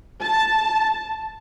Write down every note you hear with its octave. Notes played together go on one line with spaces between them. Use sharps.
A5